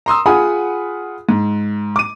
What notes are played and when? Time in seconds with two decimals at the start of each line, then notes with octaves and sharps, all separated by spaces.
0.06 A#5 C6 D#6 E6
0.26 F4 G#4 F#5 G#5 B5 D#6
1.29 G#2
1.96 D6 D#7